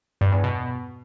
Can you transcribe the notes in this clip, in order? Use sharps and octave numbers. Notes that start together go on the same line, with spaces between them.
G2
E2
B2